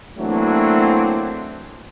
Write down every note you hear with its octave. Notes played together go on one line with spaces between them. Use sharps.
E3 F#3 A3 A#3 C4 D4